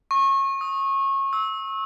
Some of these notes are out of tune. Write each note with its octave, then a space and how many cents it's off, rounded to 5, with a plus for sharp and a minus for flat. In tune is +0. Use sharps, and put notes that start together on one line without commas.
C#6 -25
D#6 +25
E6 -25